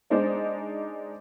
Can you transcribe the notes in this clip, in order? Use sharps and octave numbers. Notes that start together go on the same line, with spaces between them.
G#3 D4 D#4 C5 D5